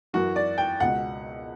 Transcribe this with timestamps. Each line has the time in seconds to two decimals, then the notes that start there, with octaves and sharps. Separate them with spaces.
0.13 F#2 E3 F#4
0.36 D5
0.58 G5
0.80 C#2 B2 F#5